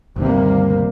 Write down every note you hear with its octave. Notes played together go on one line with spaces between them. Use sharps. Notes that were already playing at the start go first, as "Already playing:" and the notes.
G1 D2 C3 D#3 G3 A#3